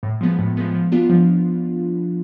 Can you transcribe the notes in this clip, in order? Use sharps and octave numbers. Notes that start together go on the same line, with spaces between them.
A2
F3 G#3 B3
A2
F3 G#3 B3
F3
B3 D4 F4
F3